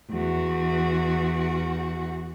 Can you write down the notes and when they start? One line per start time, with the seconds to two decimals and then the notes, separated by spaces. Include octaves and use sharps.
0.11 E2 F#4